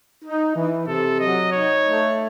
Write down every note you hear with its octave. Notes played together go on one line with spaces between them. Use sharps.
D#4
E3
C3 A4
F#3 D#5
D#4 C#5
A3